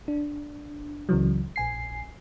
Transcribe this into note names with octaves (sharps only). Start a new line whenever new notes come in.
D4
C#2 C#3 E3 F#3
A#1 G#5 C7